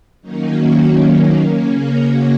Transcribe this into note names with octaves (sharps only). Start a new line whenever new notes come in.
D#3 F#3 A#3 C#4 D#4
F#4
C#3 A#3 C#4
A#4
F#4